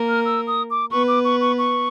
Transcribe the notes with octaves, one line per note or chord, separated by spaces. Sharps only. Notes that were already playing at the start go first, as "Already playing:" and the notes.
Already playing: A#3 A#4
F6
E6
D#6
D6
B3 B4 C#6
D6
C#6
C#6
C#6